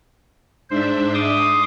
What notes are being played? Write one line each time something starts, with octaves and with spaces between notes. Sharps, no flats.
G#2 D4 C5 E5
C6 D6 D#6